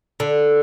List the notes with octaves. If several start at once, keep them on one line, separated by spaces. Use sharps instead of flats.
D3